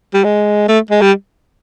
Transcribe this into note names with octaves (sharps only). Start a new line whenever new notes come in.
G3
G#3
A3
G#3
G3